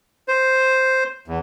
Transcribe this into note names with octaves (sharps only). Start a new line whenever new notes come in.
C5
E2